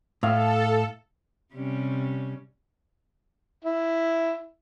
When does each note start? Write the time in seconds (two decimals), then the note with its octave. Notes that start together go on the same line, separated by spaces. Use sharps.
0.23 A2 A4 E5 F5
1.53 C3 G3 C#4
3.65 E4